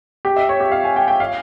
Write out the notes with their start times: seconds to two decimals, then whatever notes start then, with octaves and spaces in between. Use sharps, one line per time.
0.25 G4
0.36 E5
0.49 C#5
0.60 G4
0.72 F5
0.84 G#5
0.96 G5
1.08 G5
1.20 F5